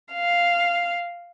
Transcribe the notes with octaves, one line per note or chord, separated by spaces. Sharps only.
F5